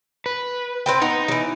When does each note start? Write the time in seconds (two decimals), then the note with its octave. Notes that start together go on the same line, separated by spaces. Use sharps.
0.26 B4
0.86 C4 B4 G5
1.02 B3 D#4
1.28 E3 F#3